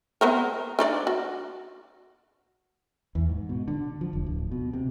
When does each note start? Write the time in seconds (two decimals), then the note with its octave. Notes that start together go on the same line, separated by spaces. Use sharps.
0.21 B3 C4 A#4
0.79 D4 D#4 D5
1.07 F#4
3.15 E2
3.29 G#2
3.49 B2
3.68 D3
4.01 F3
4.13 F1
4.26 D1
4.51 B2
4.73 C3